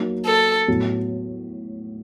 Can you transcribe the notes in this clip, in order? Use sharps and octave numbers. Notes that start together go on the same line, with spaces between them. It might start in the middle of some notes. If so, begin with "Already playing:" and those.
Already playing: F#3 A#3 D#4
A4
A2 F#3 B3